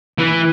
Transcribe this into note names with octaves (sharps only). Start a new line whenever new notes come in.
E3